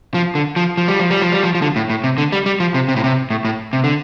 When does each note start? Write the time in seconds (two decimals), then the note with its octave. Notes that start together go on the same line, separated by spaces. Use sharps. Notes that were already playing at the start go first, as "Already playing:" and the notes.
0.14 F3
0.35 D3
0.56 F3
0.77 F3
0.88 G3
1.00 F3
1.11 G3
1.22 F3
1.32 G3
1.43 F3
1.55 F3
1.62 D3
1.76 A2
1.90 A2
2.04 C3
2.18 D3
2.32 G3
2.46 G3
2.60 F3
2.74 C3
2.88 C3
2.96 A2
3.04 C3
3.30 A2
3.45 A2
3.73 C3
3.84 D3